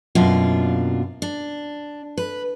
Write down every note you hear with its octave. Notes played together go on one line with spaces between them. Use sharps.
F#2 B2 A#3 D4 F4
D4
B4